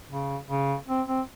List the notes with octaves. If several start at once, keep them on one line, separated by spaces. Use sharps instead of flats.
C#3
C#3
C4
C4